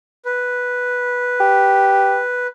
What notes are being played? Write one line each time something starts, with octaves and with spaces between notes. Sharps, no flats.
B4
G4